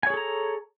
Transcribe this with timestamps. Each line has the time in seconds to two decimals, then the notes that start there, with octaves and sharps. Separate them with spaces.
0.03 G#5
0.07 C#5
0.10 G#4
0.14 A4
0.17 A#5